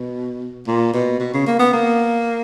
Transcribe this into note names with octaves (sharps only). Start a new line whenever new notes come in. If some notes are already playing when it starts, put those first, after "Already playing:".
Already playing: B2
A#2
B2
B2
C#3
A#3
B3
A#3